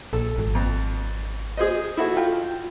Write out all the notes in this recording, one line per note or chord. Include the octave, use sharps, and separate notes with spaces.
A#1 A4
G#1
F2
G#4 C5 D#5
E4 F#4 A4
F4 G5